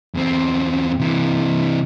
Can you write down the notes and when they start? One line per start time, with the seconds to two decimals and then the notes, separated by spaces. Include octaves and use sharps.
0.15 E2 C4
1.00 C3 E3